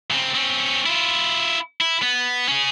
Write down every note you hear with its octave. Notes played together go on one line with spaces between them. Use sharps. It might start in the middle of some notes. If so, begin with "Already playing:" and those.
C#3 C4
C4 C#4
E4 F4
E4
B3
C#4 G#4